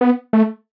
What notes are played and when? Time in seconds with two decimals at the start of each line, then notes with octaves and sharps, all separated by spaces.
0.01 B3
0.33 A3